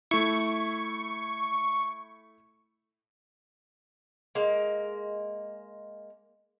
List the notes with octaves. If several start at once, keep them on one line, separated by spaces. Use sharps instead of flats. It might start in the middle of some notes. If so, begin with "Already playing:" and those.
A3 E4 C#6
G#3 A#3